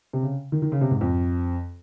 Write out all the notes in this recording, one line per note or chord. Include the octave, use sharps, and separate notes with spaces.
C3
C#3
D#3
D#3
C#3
C3
G#2
F2